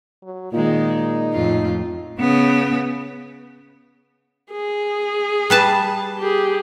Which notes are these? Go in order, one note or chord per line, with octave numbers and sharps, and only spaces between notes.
F#3
A#2 D#3 G#3 D#4
F2 A2 F4
C#3 B3
G#4
G3 B4 A5
G4 G#4